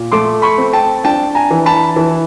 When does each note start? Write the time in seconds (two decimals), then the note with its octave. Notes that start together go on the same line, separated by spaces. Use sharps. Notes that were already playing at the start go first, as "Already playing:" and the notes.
Already playing: A#2
0.12 A3 C6 D6
0.42 B5 C#6
0.58 C4
0.73 G5 A5
1.04 D4 G5 A5
1.35 G#5 A#5
1.51 E3
1.66 A5 B5
1.96 E3